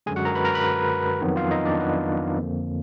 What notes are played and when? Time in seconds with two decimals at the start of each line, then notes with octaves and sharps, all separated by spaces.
0.06 F#2 D3 G#3 G#4 G#5
0.16 F#4 F#5
0.25 A#4 A#5
0.35 B4 B5
0.45 A#4 A#5
0.54 B4 B5
1.22 F2 D#3 F#3 B3
1.36 F4 F5
1.51 D#4 D#5
1.65 D4 D5
1.79 B3 B4
2.37 F2 D3 F3 A#3